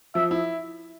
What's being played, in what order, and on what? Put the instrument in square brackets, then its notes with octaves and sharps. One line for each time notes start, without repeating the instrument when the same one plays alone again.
[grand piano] F3 [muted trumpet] E5
[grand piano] E4